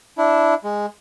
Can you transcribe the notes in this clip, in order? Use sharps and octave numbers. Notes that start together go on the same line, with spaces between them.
D4 E4
G#3